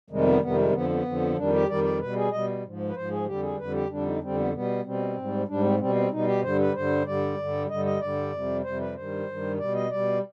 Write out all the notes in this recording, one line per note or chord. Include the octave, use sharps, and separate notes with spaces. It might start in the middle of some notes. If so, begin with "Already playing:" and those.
F2 C3 D#3 G3 G#3
B3
F2 C3 D#3 G3 B3
G#3
F2 D3 F3 B3
B3
F2 D3 F3
F2 D#3 G3 D4
G4
F2 D#3 G3 D5
D5
B2 G3 B4
G#4
B2 G3 D#5
G#2 F3
B4
G#2 F3 C5
G#4
F2 D3 G3 G4
G#4
F2 D3 G3 B4
G4
F2 D3 G3 D4
D#4
D4
F2 D3 G3 C4
B3
B2 G3 B3
B2 G3 C4
G#2 G3
G#2 G3 D4
C4
B2 G3 C4
C4
B2 G3 D#4
G4
G2 D3 G3 C5
B4
G2 D3 G3 C5
G2 D3 G3 D5
G2 D3 G3
G2 D3 G3 D#5
D#5
G2 D3 G3 D5
F2 C3 G3
F2 C3 G3 C5
B4
G2 D#3 G3 C5
G2 D#3 G3
B2 G3 D5
D#5
B2 G3 D5